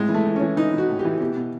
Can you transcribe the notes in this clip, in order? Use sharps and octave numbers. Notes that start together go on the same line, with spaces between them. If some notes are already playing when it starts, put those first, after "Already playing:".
Already playing: A2 G#3
E3
A3
E3
C#4
E3
E3 D#4
E3
F#4
A2
G4
E3
B2 G4
B2